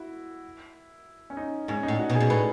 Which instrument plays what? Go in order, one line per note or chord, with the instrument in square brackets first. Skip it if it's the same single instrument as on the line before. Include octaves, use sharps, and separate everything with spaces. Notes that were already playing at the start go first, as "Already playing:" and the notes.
Already playing: [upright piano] E4 F#4
C#4
D#4
[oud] G#2 [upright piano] C#4
[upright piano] D#4
[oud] A2
[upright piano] F#4
[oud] B2
[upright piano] G#4
[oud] B2
[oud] A2 [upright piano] B4